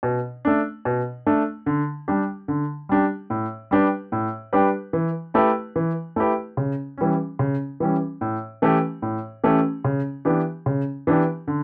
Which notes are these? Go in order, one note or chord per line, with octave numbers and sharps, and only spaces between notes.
B2
A3 D4
B2
A3 D4
D3
G3 D4 G4
D3
G3 D4 G4
A2
G3 D4 G4 B4
A2
G3 D4 G4 B4
E3
A3 E4 G4 B4
E3
A3 E4 G4 B4
C#3
E3 G3 C#4
C#3
E3 G3 C#4
A2
E3 A3 C#4 G4
A2
E3 A3 C#4 G4
C#3
E3 B3 D4 G4
C#3
E3 B3 D4 G4
D3